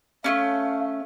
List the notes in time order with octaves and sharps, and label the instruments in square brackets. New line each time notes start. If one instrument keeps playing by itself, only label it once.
[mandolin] A3 C4 C#4 [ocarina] F5